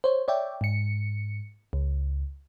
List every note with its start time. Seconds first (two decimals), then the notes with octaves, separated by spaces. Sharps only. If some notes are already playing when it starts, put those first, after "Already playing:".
0.04 C5 C#5
0.28 C#5 D5 E5 G5
0.61 G#2 C#7
1.73 C#2